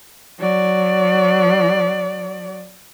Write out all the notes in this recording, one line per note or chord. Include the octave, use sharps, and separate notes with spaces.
F#3 D5